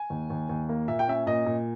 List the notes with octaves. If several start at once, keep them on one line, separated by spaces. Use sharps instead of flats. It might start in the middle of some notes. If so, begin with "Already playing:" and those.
Already playing: G#5
D#2
D#2
D#2
A#3
A#2 E5
G5
C#4 E5
A#2 D#5
A#2